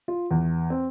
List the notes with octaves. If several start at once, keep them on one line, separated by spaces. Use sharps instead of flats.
F4
E2
C4